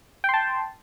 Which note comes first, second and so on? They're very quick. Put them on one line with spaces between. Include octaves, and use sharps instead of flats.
G5 C6 A5